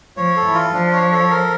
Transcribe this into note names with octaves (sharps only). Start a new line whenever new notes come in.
F3 C#5
A4
E3
F4
F3 D4
C#5
A4
A#4